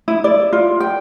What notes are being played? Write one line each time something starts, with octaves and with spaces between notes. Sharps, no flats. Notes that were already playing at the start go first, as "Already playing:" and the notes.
E4
D5
F4
G5